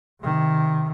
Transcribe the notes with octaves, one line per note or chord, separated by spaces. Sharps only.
C3 D#3